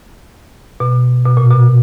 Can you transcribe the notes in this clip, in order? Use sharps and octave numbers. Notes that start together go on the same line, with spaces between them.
B2
B2
A#2
B2